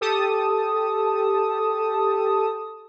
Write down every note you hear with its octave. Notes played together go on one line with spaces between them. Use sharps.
G4 A4 A5 D#6